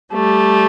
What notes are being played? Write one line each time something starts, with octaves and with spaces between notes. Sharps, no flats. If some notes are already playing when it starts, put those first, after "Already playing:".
G3 A3